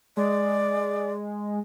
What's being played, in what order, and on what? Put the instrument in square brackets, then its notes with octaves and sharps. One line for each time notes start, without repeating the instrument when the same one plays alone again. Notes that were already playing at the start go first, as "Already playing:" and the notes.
[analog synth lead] G#3 [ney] D5